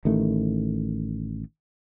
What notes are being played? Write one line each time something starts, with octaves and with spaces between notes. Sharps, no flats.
A1 D#3 A3